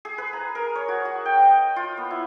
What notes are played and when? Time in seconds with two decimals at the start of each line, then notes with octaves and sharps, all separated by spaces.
0.05 G#4
0.18 B4
0.33 A#5
0.55 A#4
0.75 C#5
0.88 F#4
1.05 F#4
1.25 G5
1.42 D#5
1.76 F4
1.97 B3
2.10 E4